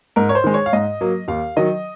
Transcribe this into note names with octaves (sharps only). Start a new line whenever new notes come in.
G#2 A#4
C#5
C5
D#3 G#3
C#5
F5
G#2 D#5
F#3 A#3
D#2 F5
D#3 F#3 D#5